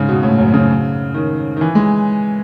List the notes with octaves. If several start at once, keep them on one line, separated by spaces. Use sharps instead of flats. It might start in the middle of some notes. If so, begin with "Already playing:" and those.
Already playing: G#2 C#3
B2
A2
F#2
C#3
D#3
D#3
E3
G#3